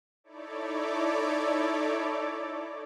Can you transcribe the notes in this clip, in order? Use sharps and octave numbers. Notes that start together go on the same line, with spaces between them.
D#4 E4 A4 C#5 D5 D6